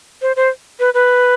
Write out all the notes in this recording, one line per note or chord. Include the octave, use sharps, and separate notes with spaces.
C5
C5
B4
B4